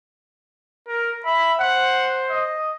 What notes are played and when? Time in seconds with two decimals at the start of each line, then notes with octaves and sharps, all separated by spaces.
0.88 A#4
1.26 E5 B5
1.59 C5 F#5
2.30 D#5